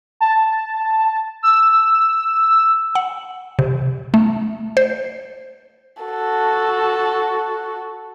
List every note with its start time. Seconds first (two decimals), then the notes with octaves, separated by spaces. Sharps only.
0.21 A5
1.43 E6
2.95 F#5
3.59 C3
4.14 A3
4.77 C5
6.03 F#4 A4